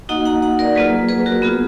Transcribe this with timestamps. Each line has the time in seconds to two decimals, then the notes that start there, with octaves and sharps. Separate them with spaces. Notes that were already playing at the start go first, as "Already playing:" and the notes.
0.09 A#3 D#4 F#4 D#5 F#5
0.25 F#5 A#5
0.42 F#5 A#5
0.59 A#4 D5
0.75 F#3 A#3 F4 G#4 B4
1.09 G#4 B4
1.26 F#4 A#4
1.42 B3 F4 G#4